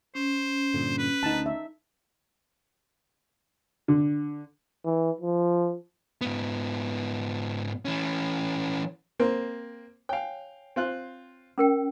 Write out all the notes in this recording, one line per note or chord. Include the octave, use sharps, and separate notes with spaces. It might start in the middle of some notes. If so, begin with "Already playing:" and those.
C#4 C5
G2 A#2 D3
B4
D2 D#4 A5
E5
D3
E3
F3
G#2 B3
E3 C#4
A#3 C4
C#5 F5 G5 G#5
C4 F4 F#6
C#4 A#4 G5